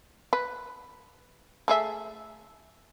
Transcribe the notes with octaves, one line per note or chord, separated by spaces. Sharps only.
B4
A3 G#4 E5